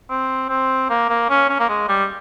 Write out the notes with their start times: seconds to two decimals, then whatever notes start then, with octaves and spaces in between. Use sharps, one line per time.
0.10 C4
0.49 C4
0.90 A#3
1.09 A#3
1.30 C#4
1.49 C#4
1.60 A#3
1.69 G#3
1.89 G3